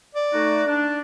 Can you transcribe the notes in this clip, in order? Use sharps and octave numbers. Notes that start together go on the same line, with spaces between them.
D5
A3 D#4 F#4
D4